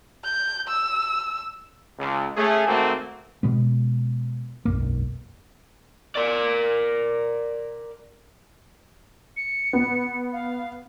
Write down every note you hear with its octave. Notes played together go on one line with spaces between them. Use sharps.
G6
E6
C#2
A3 C#4 G#4
G#1 A3 A#3 C4 F#4 A4
B2 G#3 B3
E1 B1 F#2 A#3
A#4 D5
C#7
B3
F5